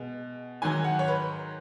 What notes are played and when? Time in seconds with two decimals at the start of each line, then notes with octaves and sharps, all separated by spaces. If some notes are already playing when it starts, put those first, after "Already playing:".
Already playing: B2 G#3
0.62 G#2 D#3 F#3 G#5
0.84 F#5
0.99 C#5
1.08 B4